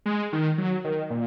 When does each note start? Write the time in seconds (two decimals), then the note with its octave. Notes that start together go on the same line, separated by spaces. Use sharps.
0.06 G#3
0.33 D#3
0.58 F#3
0.84 D#3
1.10 A#2